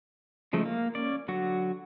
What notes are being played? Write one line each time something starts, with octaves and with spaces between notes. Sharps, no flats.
C#3 F3 G#3 A3 D#4
A#3
C#4 D5
D3 F#3 F#4